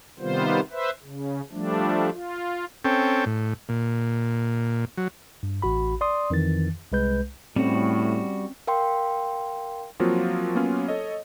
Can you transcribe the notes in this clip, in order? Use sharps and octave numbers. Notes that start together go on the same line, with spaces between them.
C3 D#3 G3 B3 F4 C5
B4 C5 E5
C#3
F3 G3 A3 D4
F4
C4 C#4 A4 G5
A2
A#2
F#3
G2
A1 F#4 B5
D5 C6 D#6
F2 D#3 E3 A6
C2 G#3 B4 G6
A2 G3 C4 C#4 F#4
A#4 F5 G5 C6
F3 F#3 A#3 C4 F4 F#4
F#3 A#3 B3 C#4 F4
A4 C#5 D#5